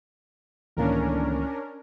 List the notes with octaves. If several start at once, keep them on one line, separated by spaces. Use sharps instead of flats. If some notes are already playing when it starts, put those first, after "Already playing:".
C#2 A2 D#3 E3 A#3 C#4 D4 A#4